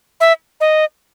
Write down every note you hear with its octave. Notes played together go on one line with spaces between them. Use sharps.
E5
D#5